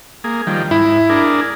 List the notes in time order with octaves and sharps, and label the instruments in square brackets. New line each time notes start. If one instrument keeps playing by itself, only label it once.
[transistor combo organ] A#3 G#4
D#3 F3 G3
[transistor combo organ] G#2 [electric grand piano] E4
[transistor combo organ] D4 G#4 A#4